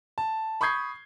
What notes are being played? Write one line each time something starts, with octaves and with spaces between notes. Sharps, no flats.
A5
B5 C#6 D#6 G6 G#6 C7